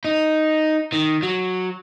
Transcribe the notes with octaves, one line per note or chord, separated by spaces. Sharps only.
D#4
D#3
F#3